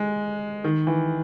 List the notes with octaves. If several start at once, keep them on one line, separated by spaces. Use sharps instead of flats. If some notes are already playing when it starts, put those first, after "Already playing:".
Already playing: G#3
D#3
E3